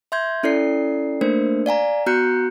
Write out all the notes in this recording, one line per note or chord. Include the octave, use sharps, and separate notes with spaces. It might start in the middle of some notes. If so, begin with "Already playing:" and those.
E5 C6 G6 G#6
C#4 E4 A4 D5 C7
A3 A#3 D4 A#4 C5
D5 F5 G#5 A#5
B3 F#4 A#5 F#6 G6 C#7